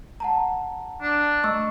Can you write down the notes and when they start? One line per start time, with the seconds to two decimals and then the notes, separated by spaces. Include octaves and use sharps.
0.20 F#5 A5 A#5
1.02 D4
1.44 A3 D#5 C#6 E6